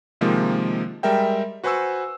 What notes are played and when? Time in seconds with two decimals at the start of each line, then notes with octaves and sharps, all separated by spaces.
0.21 C3 D#3 F3 G#3 A#3
1.03 G3 G#3 A#4 E5 G5
1.64 F#4 B4 C5 G#5 C#6 E6